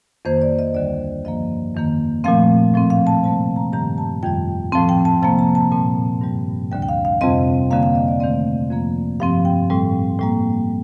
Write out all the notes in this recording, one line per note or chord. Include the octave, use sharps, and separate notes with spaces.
F2 D#3 A#3 C5
D5
D#5
D2 D3 G3 D5
G2 F3 A#3 D#5
F2 D#3 A#3
A#2 F3 A3 C4 F5
A2 F3 C4
F5
A5
C3 G3 A#3 A5
A#5
G2 D#3 G3 A#5
A5
F2 D#3 G3 G5
A2 F3 C4 A5
G5
A5
C3 F3 A#3 A5
A#5
A5
A#2 G3 C4 A5
G2 D#3 G3
D2 D3 G3 G5
G5
F5
F5
F2 C3 G3 C4 D#5
F2 D3 G3 A#3 F5
F5
D#5
D5
C3 D#3 A3 C4 D5
F2 D3 F3 A#3
G2 F3 C4 F5
G5
A2 G3 C4
A2 G3 A#3